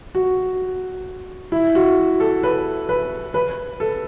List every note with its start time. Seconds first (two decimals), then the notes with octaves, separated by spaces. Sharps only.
0.15 F#4
1.52 E4
1.75 F#4
2.20 A4
2.43 B4
2.89 B4
3.34 B4
3.80 A4